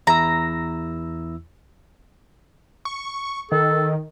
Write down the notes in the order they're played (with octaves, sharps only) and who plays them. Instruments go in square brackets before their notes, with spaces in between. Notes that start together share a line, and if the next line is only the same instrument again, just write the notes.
[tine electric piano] E2 E4 E6 [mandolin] A#5
[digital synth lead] C#6
[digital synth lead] D#3 [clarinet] A4